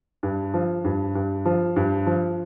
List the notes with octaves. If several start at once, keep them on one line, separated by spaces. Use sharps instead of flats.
G2
F3
G2
G2
F3
G2
F3